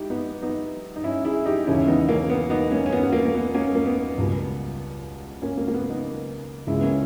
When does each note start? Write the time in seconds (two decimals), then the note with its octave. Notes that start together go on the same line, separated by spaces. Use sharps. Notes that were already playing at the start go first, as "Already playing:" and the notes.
Already playing: G#3 D#4 E4 G4
0.10 B3 D#4
0.42 B3 D#4
0.96 D#4
1.04 C#4 E4
1.25 E4 G#4
1.46 D#4 G4
1.67 E1 D#2 C#3 C#4 E4
1.87 B3 D#4
2.09 A#3 C#4
2.30 B3
2.50 B3 D#4
2.71 A#3 C#4
2.86 C#4
2.93 B3
3.03 B3
3.13 A#3
3.25 A#3
3.35 B3
3.55 A#3 C#4
3.75 A#3
3.86 B3
4.18 C#2 B2 G3
5.42 A#3 C#4
5.57 A#3
5.68 A#3
5.74 B3
5.90 B3 D#4
6.67 C#2 C#3 G#3 C#4 E4
6.79 B3
6.83 A#3 C#4